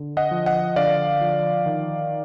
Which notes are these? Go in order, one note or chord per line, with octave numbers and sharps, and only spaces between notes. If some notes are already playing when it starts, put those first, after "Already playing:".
Already playing: D3
D#5 F#5
F3
D#5 F#5
D3 D5 F5
F3
D#3